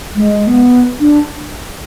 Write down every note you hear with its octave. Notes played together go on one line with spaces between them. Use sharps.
G#3
B3
D4